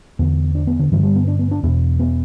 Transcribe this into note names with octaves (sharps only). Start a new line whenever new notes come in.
E2 D3 B3
D4
B3
D3
G2 D3 E3
G3
B3
D4
B3
D4
E2 B2 B3
B3